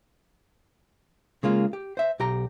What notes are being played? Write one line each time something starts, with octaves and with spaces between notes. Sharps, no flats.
C#3 G#3 A#3 F4
G4
C5 E5
B1 G4 A#5